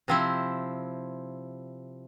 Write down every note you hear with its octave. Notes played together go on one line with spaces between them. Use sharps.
C3 F3 C4 E4